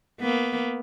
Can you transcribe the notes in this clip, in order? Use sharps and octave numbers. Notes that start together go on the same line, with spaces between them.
A#3 B3